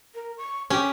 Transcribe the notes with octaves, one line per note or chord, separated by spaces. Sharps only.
A#4
C#6
C#4 G4